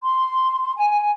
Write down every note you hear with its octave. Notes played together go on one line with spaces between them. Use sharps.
C6
G#5